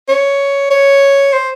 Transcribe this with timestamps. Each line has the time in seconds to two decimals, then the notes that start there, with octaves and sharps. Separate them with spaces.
0.09 C#5
0.70 C#5
1.33 C5